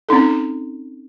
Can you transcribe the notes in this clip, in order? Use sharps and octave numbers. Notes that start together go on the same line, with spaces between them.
C4 C#4 D#4 A4